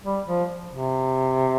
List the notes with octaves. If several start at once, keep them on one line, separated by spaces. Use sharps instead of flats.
G3
F3
C3